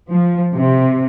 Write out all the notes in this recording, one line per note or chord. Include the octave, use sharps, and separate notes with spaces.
F3
C3